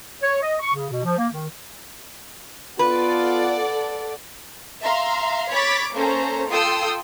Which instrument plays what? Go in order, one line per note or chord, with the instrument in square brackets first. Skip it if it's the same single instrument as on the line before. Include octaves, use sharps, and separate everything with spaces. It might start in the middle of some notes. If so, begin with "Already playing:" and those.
[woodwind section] C#5
D#5
C#6
C#3
B2
F3
A#3
D#3
[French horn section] B3 F4 [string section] A4 D5 F#5 [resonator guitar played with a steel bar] B4
[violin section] E5 F5 A#5 C6
C#5 B5 D6 A6 B6
A#3 C#4 A4 C5 A#5
F4 A4 G5 C6 D#6 E6